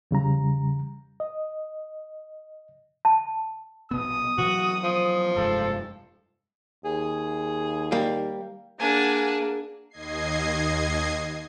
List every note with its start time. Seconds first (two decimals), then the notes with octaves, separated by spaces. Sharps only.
0.11 E2 C#3 G3 A#5
1.20 D#5
3.05 A5
3.91 A#1 B2 B3 D#6
4.38 B2 E3 F#3 F#4
4.83 F3
5.36 F1 G2 G#3 A4
6.85 D#2 G#4
7.92 G3 A#3
8.80 A#3 D4 G#4 F#5 G#5
9.90 D#2 D#5 G#6 C7